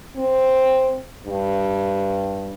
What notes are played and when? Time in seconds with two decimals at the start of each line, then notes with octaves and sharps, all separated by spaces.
0.16 C4
1.25 G2